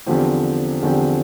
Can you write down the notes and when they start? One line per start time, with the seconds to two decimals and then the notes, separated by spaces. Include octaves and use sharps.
0.07 E2 D3 F3 C4 G4
0.82 E2 D3 F3 C4 G4